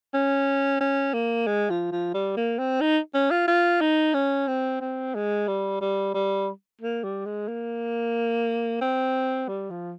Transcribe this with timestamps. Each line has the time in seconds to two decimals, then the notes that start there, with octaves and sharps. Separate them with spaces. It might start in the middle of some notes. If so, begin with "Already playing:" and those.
0.14 C#4
0.80 C#4
1.13 A#3
1.47 G#3
1.70 F3
1.92 F3
2.14 G3
2.37 A#3
2.59 C4
2.81 D#4
3.14 C#4
3.31 F4
3.48 F4
3.81 D#4
4.14 C#4
4.48 C4
4.80 C4
5.15 G#3
5.48 G3
5.81 G3
6.14 G3
6.81 A#3
7.04 G3
7.25 G#3
7.48 A#3
8.81 C4
9.48 G3
9.70 F3